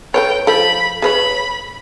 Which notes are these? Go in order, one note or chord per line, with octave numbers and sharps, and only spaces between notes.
A4 B4 C#5 G5
F3 A4 B5
G#4 B4 C#5 B5